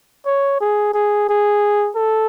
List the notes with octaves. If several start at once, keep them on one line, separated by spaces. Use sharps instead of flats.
C#5
G#4
G#4
G#4
A4